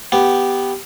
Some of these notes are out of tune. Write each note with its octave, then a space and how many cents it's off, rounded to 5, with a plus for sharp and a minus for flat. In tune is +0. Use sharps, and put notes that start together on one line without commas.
B3 +0 G4 +0